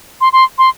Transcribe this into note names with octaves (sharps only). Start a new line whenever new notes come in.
C6
C6
C6